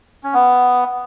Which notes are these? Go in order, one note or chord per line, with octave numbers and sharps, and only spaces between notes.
C#4
B3